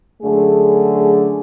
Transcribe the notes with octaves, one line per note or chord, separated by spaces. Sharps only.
F#2 D3 A3 G#4